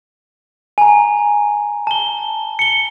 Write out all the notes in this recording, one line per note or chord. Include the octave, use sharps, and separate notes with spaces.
G#5 A#5
A5 G7
C#7 G7